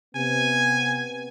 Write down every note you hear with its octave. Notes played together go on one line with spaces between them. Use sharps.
C3 B3 G#5